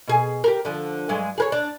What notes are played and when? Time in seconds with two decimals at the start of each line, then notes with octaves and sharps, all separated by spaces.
0.08 B2 G#4
0.44 G4 A4 A#4
0.65 D3 F3
1.09 G2 F#3 G#3
1.38 G#4 A#4 C#5
1.52 D4